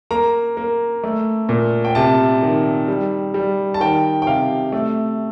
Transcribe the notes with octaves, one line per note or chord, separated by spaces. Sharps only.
A#3 A#5
A#3
A3
A#2
G5
C3 A5
D#3
G3
G3
A5
D#3 G5
G5
C3 F5
A3